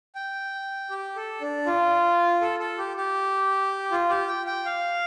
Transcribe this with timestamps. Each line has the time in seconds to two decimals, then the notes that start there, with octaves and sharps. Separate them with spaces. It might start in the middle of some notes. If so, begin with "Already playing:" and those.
0.15 G5
0.90 G4
1.16 A4
1.41 D4
1.66 F4
2.41 A4
2.59 A4
2.78 G4
2.97 G4
3.91 F4
4.09 G4
4.28 G5
4.47 G5
4.66 F5